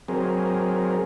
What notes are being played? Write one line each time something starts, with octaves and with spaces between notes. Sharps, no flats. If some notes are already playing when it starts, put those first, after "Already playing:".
F#3 C4 G#4 A#4